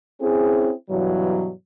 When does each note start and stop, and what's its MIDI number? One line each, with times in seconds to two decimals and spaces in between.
0.21 0.72 60
0.21 0.72 61
0.21 0.72 64
0.21 0.72 68
0.90 1.50 43
0.90 1.50 47
0.90 1.50 52
0.90 1.50 54